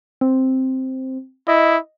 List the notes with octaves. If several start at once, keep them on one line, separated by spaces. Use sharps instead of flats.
C4
E4 D#5